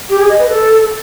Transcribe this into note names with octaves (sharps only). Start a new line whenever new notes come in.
G4
G#4
D#5
B4
A4